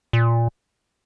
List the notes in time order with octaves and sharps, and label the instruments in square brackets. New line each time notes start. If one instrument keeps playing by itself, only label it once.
[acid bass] A#2